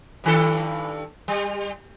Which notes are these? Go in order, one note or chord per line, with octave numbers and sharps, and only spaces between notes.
G2 D#3 A4
G3